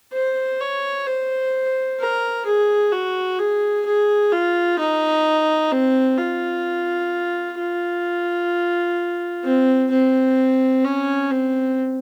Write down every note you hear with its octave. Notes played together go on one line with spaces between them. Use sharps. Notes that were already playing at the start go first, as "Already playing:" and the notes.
C5
C#5
C5
A#4
G#4
F#4
G#4
G#4
F4
D#4
C4
F4
F4
C4
C4
C#4
C4